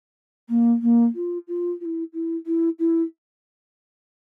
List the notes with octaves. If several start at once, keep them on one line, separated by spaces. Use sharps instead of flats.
A#3
A#3
F4
F4
F4
E4
E4
E4
E4